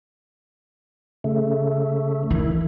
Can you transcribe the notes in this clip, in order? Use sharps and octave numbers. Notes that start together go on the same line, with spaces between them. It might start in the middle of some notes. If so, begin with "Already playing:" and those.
C#3 A3
D#3 E3 E4